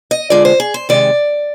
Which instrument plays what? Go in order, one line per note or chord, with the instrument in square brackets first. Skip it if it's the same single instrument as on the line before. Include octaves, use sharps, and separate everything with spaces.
[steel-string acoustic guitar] D#5
D3 F3 G#3 D5
C5
G#4
C5
C3 D#3 G#3 D5